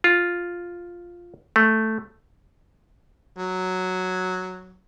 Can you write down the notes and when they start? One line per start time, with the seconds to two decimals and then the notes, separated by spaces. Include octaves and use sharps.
0.04 F4
1.56 A3
3.38 F#3